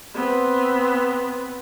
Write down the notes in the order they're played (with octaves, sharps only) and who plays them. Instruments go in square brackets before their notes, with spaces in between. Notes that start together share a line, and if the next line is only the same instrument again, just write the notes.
[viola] B3 C4